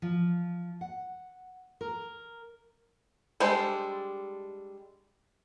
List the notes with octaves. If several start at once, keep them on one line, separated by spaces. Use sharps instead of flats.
F3
F#5
A#4
G3 G#3 D4 A4 C5